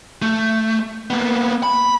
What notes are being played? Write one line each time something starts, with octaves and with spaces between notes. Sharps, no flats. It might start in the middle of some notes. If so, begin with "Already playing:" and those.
A3
A#3 B3
B5